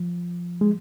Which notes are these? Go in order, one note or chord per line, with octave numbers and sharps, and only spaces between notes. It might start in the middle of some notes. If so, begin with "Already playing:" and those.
Already playing: F3
G#3